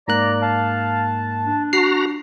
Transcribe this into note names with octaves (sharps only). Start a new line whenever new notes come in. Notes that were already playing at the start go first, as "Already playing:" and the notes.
G#2 A#3 D5 A#5 F#6
F5 A5
D4
F#4 A#5 C7